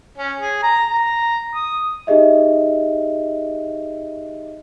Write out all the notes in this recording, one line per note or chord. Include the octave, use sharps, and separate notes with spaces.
C#4
G#4
A#5
A#5
D#6
D#4 G4 G#4 D#5 E5